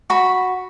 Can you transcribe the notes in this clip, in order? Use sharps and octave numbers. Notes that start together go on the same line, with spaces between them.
F#4 B5